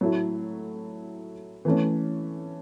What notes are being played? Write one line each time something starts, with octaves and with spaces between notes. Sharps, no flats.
A2 F#3 A3 E4
E3 A3 C#4